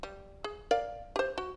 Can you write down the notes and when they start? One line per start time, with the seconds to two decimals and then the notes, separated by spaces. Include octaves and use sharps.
0.03 G3
0.44 G#4
0.71 A#4 D5 F5
1.16 G4 C5
1.38 F#4